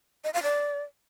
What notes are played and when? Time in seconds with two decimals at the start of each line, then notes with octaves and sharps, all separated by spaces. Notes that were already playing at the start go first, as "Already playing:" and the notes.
0.24 D#5
0.34 F5
0.43 D5